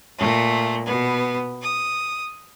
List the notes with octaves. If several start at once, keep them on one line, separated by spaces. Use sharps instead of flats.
A#2 A3
B2 B3
D#6